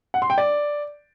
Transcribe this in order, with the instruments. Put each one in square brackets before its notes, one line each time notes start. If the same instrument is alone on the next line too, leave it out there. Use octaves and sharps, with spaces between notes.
[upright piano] F#5
C6
G5
D5